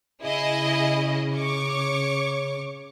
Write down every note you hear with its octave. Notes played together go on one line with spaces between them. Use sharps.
C#3 E4 G#4 D#5
C#5 C#6 D6